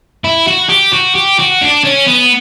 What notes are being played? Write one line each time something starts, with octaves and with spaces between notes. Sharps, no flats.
E4
F#4
G4
F#4
G4
F#4
D4
C#4
B3